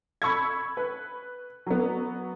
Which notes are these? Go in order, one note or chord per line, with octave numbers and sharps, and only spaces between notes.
B5 C#6 E6 G#6
B4
F#3 B3